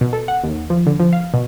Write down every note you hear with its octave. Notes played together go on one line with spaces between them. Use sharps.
B2
A4
F#5
D#2
F3
D3
F3
F5
B2